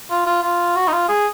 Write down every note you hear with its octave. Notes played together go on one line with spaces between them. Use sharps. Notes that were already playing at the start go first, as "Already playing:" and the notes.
F4
F4
F4
F#4
D#4
F4
G#4